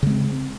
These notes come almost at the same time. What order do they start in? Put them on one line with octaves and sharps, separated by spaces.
C#3 G#3 C4